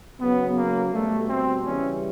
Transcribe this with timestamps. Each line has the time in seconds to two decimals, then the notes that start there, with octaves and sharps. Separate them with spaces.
0.21 C#3 F#3 B3
0.58 A#3
0.94 B2 G3 A3
1.29 C4
1.66 C#3 E3 G3 C#4